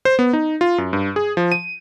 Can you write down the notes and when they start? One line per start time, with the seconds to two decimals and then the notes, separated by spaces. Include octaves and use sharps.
0.05 C5
0.19 B3
0.33 D#4
0.61 F4
0.78 F#2
0.93 G2
1.16 G#4
1.37 F3
1.52 D#7